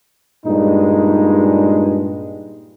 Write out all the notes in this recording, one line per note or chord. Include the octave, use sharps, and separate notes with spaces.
G2 A#2 G#3 D#4